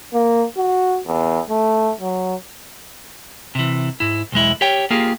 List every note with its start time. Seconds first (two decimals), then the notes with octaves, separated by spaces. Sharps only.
0.13 A#3
0.57 F#4
1.07 E2
1.49 A3
2.01 F#3
3.55 C3 E3
4.00 G#2 E4
4.32 B1 E2 G#3 E4
4.61 G4 C#5 G5
4.90 A#3 F4 G4 G#4